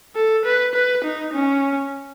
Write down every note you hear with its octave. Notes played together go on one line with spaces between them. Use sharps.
A4
B4
B4
D#4
C#4